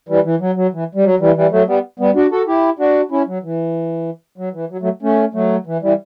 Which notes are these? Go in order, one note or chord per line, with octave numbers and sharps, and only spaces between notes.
E3 G3
E3
F#3
F#3
E3
G3
F#3
E3 G3
E3 G3
F#3 A3
G3 B3
G3 B3
D4 F#4
F#4 A4
E4 G4
D4 F#4
C#4 E4
F#3
E3
F#3
E3
F#3
F#3 A3
A3 C#4
F#3 A3
E3
E3 G3